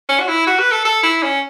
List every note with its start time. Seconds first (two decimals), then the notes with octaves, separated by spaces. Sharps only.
0.09 C#4
0.20 F#4
0.28 E4
0.47 F#4
0.59 B4
0.72 A4
0.85 A4
1.03 E4
1.23 C#4